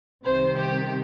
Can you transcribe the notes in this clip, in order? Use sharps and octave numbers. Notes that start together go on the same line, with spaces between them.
C2 C3 D#3 C5
G4